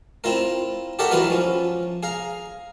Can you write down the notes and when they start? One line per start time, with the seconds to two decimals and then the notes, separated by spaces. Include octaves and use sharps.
0.24 C4 E4 F4 A#4
0.99 G4 A4 A#4 C#5 E5 F#5
1.11 E3 F#3 E4 F4 A#4 B4
1.30 F3 C#4
2.03 G#4 F5 A#5